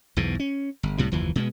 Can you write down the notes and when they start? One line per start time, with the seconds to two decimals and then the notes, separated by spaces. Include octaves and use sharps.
0.17 B1 E2 G#2 B2
0.40 C#4
0.83 G1
0.98 C2 A2 C3 G3
1.12 F#1 D#2 E3 F3
1.36 B2 G#3 B3